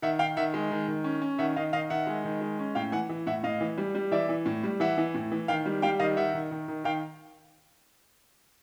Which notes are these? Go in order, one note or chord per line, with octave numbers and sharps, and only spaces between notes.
D#3 E5 F#5
D#3 F5 G5
D#3 E5 F#5
G#3
D#3
D#3
C#4
C#4
D#3 E5 F#5
D#3 D#5 F5
D#3 D#5 F5
D#3 E5 F#5
G#3
D#3
G#3
C#4
A2 F5 G5
E3 F#5 G#5
E3
A2 E5 F#5
A2 D#5 F5
E3
G3
G3
E3 D5 E5
E3
A2
G3
E3 E5 F#5
E3
A2
E3
D#3 F5 G5
G3
G3 F5 G5
D#3 D#5 F5
D#3 E5 F#5
D#3
D#3
D#3
D#3 F5 G5